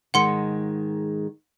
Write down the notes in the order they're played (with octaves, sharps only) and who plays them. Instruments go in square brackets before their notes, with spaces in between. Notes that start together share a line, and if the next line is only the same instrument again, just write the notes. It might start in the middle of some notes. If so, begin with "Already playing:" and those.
[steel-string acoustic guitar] G#2 D#3 G#3 [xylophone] F#5 C6 C#7